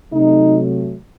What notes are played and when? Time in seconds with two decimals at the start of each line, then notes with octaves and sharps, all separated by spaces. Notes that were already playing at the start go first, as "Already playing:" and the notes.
0.11 C3 F#3 A3 D#4